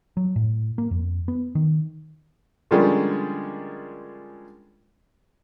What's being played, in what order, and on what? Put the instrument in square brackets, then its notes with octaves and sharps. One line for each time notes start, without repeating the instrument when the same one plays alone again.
[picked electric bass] F#3
A2
A#3
F2
B3
D#3
[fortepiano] D3 F3 G3 G#3 A#3 C#4